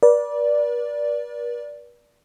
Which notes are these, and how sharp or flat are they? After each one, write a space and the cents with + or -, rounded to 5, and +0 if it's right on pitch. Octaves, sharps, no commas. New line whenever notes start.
B4 -45 D5 -5